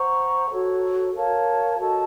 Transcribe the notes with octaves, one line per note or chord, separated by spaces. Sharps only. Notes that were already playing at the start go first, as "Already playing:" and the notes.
Already playing: C5 F#5 A#5 C#6
F#4 A4 C#5
A#4 C#5 F5 A5
F#4 A4 D#5 A5